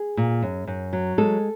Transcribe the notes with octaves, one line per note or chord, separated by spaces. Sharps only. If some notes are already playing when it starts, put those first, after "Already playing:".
Already playing: G#4
A#2
F#2
F#2
F#3
G#3 A4